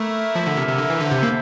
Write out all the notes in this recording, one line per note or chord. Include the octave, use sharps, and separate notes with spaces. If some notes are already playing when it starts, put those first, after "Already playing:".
Already playing: A3 A#3 E4 A#4 E5
F3
D3
C3
C3
D3
E3
D3 C4 E4 A4 C5 E5
C3
A#3